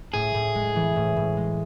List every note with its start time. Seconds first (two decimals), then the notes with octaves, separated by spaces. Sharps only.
0.14 A2 G#4
0.34 A2
0.55 G#3
0.76 E3
0.96 A2
1.16 A2
1.37 G#3